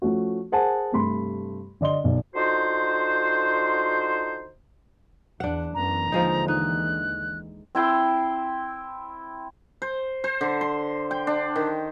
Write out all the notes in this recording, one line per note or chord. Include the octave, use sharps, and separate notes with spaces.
F3 A3 C#4 F#4
G#4 A#4 C5 F#5 G#5 A5
G2 C3 A3 B5 C6
D3 D5 D#5 C6 G7
B1 D5
D3 D#4 F4 F#4 C5
E2 D4 F#5
F#2 E3 B3 A#5
D#2 D3 E3 F3 G#3 D#4
D#4 F#6
C4 E4 G5 C6
C5
C5
D3
C6
G5
D4
D#3